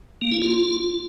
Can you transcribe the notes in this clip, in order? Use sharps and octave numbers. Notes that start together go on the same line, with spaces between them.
A#3
E4
F4